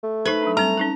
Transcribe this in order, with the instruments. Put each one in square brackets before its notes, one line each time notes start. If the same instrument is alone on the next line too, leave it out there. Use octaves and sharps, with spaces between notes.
[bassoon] A3
[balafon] D#4 C5 [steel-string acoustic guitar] B4
[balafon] F#3 D4
[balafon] G3 C4 A5 [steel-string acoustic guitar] A#5
[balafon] C#4 D#4 A4